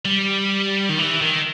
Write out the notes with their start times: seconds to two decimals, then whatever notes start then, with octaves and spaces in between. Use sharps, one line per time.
0.05 G3
0.89 D#3
0.99 E3
1.21 D#3